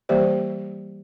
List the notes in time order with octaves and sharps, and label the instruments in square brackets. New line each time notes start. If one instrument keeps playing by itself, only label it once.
[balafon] E3 G3 A#3 G4 C5 D5